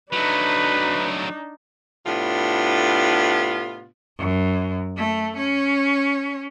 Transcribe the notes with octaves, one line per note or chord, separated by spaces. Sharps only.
F#3 A3 D4 D#4 B4
A2 C3 B3 D4 F4
F#2
A3
C#4